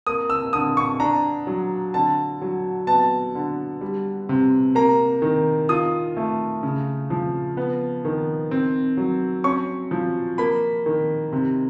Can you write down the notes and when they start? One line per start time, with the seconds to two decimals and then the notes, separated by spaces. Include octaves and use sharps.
0.07 A#3 D#6
0.30 E6
0.53 D3 D#6
0.77 C#6
1.00 D4 A#5
1.47 F#3
1.94 D3 A5
2.42 F#3
2.87 B3 A5
3.35 D3
3.81 G3
4.29 C3
4.75 A#3 A#5
5.22 D#3
5.69 F4 D#6
6.17 A3
6.63 C#3
7.10 F3
7.57 B3
8.05 D#3
8.51 C4
8.97 F#3
9.44 C#4 C#6
9.91 F3
10.38 A#3 B5
10.86 D#3
11.32 C3